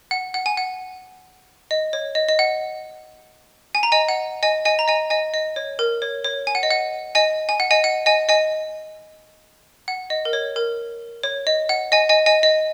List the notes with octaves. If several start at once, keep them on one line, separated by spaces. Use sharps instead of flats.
F#5
F#5
G#5
F#5
D#5
C#5
D#5
D#5
F#5
G#5
A#5
D#5 G#5
F#5
D#5 G#5
D#5 G#5
A#5
D#5 G#5
D#5 G#5
D#5
C#5
A#4
C#5
C#5
G#5
F#5
D#5
F#5
D#5 G#5
G#5
F#5
D#5 G#5
F#5
D#5 G#5
D#5 G#5
F#5
D#5
A#4
C#5
A#4
C#5
D#5
F#5
D#5 G#5
D#5 G#5
D#5 G#5
D#5